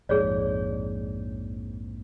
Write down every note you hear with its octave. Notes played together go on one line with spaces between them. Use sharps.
A#1 F2 G#2 G#4 C#5 D5